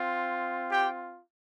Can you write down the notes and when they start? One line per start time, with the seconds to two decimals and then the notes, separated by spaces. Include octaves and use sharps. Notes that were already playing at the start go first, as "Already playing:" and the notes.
Already playing: C4 F4
0.70 G4 G5